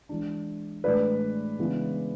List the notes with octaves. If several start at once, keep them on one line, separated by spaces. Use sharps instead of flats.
E3 G#3 D4
A2 E3 G#3 D4 B4 D5
C#3 E3 G#3 B3 D4